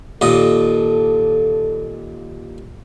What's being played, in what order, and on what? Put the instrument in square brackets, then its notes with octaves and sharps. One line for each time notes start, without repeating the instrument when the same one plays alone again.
[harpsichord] D#2 A#2 D#5 [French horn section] A4